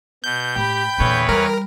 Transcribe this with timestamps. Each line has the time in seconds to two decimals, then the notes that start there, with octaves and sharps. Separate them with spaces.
0.24 B2 G6
0.56 A2 G4 G5 B5
0.98 E2 A#2 D3 B4 C#5
1.29 G3 A#4